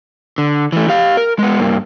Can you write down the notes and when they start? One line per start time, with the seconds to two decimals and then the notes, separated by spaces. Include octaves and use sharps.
0.38 D3
0.72 E3 A3
0.88 G4 F5
1.17 A#4
1.39 G#3 B3
1.60 G2 A#3